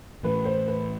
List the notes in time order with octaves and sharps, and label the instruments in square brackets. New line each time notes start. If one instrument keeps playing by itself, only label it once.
[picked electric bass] A2 E3 A3 [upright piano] B4
[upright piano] C5
B4